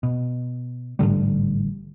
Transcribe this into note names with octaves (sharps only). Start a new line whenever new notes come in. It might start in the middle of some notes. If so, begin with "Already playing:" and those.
B2
A1 G#2 D3 G3